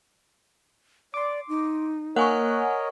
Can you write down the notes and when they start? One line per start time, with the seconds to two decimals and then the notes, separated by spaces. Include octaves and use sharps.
1.14 D5 C6 D6
1.48 D#4
2.16 A#3 A#4 C#5 D#5 F#5 G#5 C#6 F#6